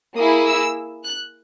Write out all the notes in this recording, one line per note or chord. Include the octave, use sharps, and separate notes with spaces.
A#3 E4 G#4 D#6
E6
F#6